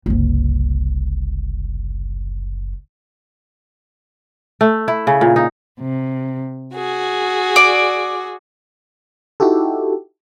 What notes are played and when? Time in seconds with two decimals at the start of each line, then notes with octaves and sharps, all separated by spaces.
0.06 F#1 C2
4.61 A3
4.88 E4
5.07 C#3
5.21 A#2
5.36 D#4
5.81 C3
6.72 F#4 G#4
7.56 D5
9.40 D#4 E4 F#4 G4 A4